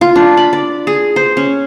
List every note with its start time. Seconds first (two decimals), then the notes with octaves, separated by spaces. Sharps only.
0.01 F4
0.16 D4
0.37 B5
0.53 D5
0.87 G#4
1.16 C5
1.37 C#4